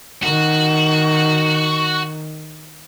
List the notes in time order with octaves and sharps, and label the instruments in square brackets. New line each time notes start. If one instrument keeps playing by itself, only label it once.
[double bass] D#3 [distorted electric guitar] F#4